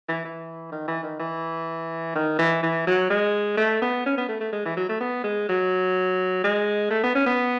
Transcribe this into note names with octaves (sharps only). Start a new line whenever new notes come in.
E3
E3
D#3
E3
D#3
E3
D#3
E3
E3
F#3
G#3
A3
B3
C#4
B3
A3
A3
G#3
E3
F#3
A3
B3
G#3
F#3
G#3
A3
B3
C#4
B3